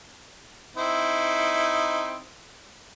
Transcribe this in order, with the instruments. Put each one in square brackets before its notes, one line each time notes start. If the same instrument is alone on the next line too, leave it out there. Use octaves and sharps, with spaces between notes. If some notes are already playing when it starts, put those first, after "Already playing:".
[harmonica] C4 D#4 E4